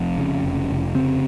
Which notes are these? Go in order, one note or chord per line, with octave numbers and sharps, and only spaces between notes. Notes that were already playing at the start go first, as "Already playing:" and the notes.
Already playing: F1 F2
C#3
F1
F1
C#3 C4